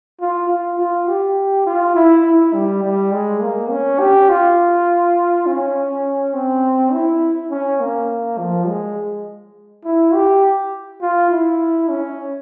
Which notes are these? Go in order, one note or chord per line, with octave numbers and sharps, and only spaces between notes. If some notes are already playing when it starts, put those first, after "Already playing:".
F4
F4
F4
G4
F4
E4
E4
G3
G3
G#3
A#3
C#4
G4
F4
C#4
C4
E4
C#4
A#3
F3
G#3
E4
G4
F4
E4
C#4